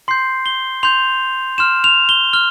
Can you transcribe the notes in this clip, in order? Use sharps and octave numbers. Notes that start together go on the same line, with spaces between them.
C6 G6 C7
G7
C6 G6 F7
C6 F6 E7
F7
G7
F6 G7